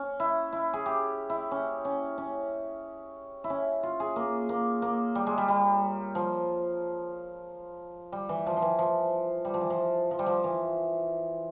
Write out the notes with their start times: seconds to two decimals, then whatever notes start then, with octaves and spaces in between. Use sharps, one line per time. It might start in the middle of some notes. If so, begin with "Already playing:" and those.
Already playing: C#4
0.20 E4
0.53 E4
0.73 G#4
0.86 G4
1.30 E4
1.51 C#4
1.85 C#4
2.18 C#4
3.44 E4
3.50 C#4
3.83 F4
4.00 G#4
4.16 A#3
4.49 A#3
4.82 A#3
5.15 G3
5.27 G#3
5.38 G3
5.48 G3
6.15 F3
8.12 G3
8.29 E3
8.46 F3
8.57 F3
8.62 E3
8.79 F3
9.45 G3
9.54 F3
9.61 E3
9.70 F3
10.11 F3
10.19 G3
10.26 F3
10.44 E3